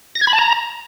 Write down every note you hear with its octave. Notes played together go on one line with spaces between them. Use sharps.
A#6
G#6
B5
A5
A#5